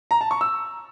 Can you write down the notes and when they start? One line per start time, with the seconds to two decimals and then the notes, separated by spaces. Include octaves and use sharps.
0.11 A#5
0.21 A5
0.31 C#6
0.41 E6